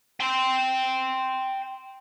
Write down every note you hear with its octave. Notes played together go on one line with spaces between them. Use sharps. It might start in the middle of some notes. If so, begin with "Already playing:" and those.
G5 C6